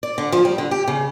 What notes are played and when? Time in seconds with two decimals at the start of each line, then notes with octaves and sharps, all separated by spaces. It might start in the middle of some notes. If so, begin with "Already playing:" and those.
0.03 D5
0.18 D3
0.32 F3
0.45 G3
0.58 D3
0.71 G4
0.88 C#3